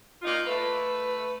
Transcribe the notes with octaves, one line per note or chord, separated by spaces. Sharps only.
A#3 D#4 F4
A3 B4